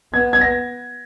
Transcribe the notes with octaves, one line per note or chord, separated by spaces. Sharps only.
B3 G#6
G#6
A#6